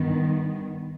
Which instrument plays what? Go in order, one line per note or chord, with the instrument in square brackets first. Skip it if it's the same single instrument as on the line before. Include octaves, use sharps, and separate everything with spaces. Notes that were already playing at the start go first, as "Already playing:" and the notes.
Already playing: [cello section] G2 D#3 B3